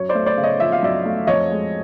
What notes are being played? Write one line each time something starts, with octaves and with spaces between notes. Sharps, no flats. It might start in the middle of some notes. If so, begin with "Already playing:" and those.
Already playing: F#2 C#5
C5 D5
A3
C5 D5
C#3
C#5 D#5
F3 E5
F5
F#2 D5 E5
A3
F2 C#5 D#5
G#3